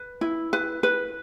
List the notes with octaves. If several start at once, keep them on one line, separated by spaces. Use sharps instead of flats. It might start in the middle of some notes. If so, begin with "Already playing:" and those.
Already playing: B4
E4
B4
B4